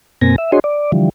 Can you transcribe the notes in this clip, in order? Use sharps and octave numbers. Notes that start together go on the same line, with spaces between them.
F#2 B2 A#3 C4 G#5 A#6
E5
D4 F#4 G#4 C#5 D#5 C6
D5
D3 E3 F3 G3